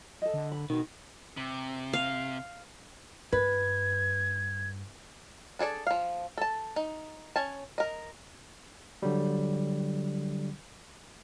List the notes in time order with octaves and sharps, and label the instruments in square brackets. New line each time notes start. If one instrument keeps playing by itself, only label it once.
[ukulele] A4 D#5
[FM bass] D3
[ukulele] B5
[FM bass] B2 [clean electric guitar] D#3
[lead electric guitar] C3
[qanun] F5
[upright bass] G2 [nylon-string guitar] B4 [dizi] G#6
[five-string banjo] D4 G#4 A4 D5
F3 F5
A4 A5
D#4
C#4 G#5 A5
A#4 D#5
[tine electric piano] D3 F#3 G3